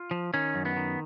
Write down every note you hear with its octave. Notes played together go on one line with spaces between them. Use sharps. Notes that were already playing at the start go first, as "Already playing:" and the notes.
Already playing: F4
F3
D#3 C#4
F#2
B3
D#3